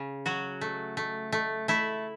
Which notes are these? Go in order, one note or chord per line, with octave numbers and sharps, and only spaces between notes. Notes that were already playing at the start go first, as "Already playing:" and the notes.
Already playing: C#3
F#3 F#4
A3
A3
A3
A3 E4